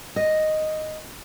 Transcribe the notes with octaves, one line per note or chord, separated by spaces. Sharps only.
D#5